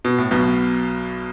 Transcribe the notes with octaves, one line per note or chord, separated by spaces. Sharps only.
B2
A2
B1 B2